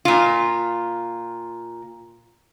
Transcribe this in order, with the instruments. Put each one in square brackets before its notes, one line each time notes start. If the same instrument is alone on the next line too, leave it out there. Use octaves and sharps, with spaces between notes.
[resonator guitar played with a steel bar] A#2 F4